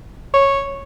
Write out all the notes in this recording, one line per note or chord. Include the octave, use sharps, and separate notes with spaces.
C#5